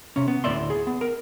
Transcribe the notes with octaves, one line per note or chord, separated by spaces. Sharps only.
C3 C#4
B3
D2 A2 C5 D5 E5 C6
G#4
B3
A#4